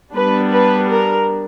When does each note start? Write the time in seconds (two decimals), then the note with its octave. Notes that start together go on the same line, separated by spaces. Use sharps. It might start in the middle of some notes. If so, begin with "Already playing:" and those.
0.12 G3 B3 D4 B4
0.51 B4
0.89 A#4